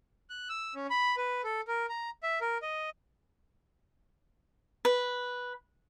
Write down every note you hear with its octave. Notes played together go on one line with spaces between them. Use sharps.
F#6
E6
C#4
B5
B4
A4
A#4
A#5
E5
A#4
D#5
B4